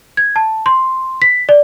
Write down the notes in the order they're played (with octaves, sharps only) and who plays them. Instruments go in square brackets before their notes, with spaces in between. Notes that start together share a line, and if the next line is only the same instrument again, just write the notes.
[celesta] G#6
A5
C6
B6
D5